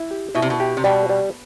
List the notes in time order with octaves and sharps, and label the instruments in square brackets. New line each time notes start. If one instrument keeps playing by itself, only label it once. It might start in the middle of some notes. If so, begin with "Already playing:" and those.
Already playing: [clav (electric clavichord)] E4
G4
[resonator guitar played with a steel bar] B2 [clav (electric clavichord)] E4
[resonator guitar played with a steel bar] C3
B2
[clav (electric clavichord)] G4
[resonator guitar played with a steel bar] C3
[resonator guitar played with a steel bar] B2 [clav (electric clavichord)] G3
[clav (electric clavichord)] G3